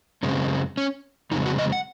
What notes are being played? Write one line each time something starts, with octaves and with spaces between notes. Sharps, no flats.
F#2 C#3 G#3 C4 C#4
C#4
F2 C#3 G#3 C4 D#4
F#4
D#5
F#5